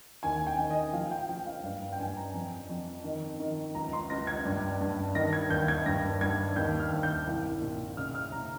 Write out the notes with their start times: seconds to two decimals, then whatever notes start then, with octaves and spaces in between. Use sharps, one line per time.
0.23 D#2 G#5
0.47 G5
0.58 D#3
0.70 D#5
0.93 F3 F5
1.11 G5
1.29 F3 G5
1.46 F5
1.63 G2 F5
1.92 G5
1.99 G2 G#5
2.17 A#5
2.34 F2
2.69 F2
3.04 D#3
3.40 D#3
3.75 C#2 A#5
3.93 C6
4.10 C#2 A#6
4.27 G#6
4.45 G2
4.81 G2
5.15 D#3 A#6
5.33 G#6
5.50 D#2 G6
5.68 G#6
5.86 G2 A#6
6.21 G2 G#6
6.56 D#2 G6
6.80 F6
6.92 D#2
7.03 G6
7.27 C2
7.62 A#2
7.97 C#3 F6
8.15 F6
8.32 C#3 A#5